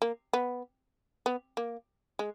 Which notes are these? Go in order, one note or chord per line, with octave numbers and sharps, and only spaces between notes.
A#3
B3
B3
A#3
G#3